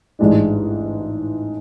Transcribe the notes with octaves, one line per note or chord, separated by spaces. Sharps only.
A1 G#2 G#3 D4